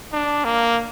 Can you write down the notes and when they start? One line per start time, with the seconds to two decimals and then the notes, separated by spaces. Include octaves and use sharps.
0.13 D4
0.45 A#3